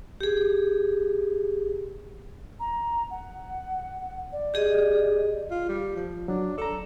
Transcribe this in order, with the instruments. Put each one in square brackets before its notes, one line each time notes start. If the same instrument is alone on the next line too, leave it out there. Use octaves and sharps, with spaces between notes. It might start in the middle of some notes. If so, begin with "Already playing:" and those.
[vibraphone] G4 G#4
[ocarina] A#5
F#5
D5
[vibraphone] G4 G#4 D#5
[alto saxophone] F4
G3
F3
[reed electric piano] F#3 [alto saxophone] D4
[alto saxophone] A4 [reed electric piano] D5 A#5